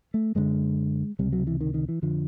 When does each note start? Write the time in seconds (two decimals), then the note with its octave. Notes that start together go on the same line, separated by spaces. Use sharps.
0.14 A3
0.35 F#2 D3 G#3
1.19 C#2 C3 G3
1.33 F#3
1.47 E3
1.61 D#3
1.74 D#3
1.89 E3
2.02 F2 D3 F3